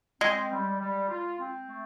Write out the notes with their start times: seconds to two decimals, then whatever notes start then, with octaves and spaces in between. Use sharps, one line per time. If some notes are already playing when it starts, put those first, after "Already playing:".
0.21 G#3 C4
0.51 G3
0.79 G3
1.08 F4
1.38 C4
1.67 A3